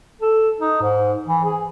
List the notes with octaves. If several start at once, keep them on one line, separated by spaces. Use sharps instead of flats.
A4
D#4
G#2
E3
G#4